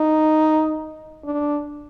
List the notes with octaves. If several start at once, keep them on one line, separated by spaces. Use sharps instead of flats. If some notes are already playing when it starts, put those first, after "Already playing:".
Already playing: D#4
D4